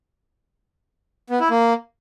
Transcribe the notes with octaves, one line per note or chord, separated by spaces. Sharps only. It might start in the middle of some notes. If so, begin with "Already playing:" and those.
B3
E4
A#3